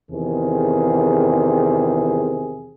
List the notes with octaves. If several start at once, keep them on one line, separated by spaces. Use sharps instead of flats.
E2 C3 D#3 G#4